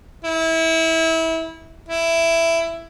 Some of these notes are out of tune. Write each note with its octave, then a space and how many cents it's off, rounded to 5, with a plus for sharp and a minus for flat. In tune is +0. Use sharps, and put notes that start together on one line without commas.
E4 -25
E4 +10